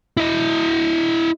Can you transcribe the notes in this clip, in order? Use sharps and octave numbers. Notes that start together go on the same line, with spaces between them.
E4 D#5